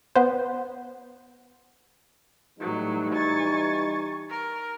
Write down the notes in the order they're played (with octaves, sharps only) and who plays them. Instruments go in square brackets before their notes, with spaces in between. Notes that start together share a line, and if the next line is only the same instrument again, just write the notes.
[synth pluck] B3 C5
[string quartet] A2 F#3 [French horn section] E3 G3 D#4
[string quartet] G#5 C#6 A6
A#4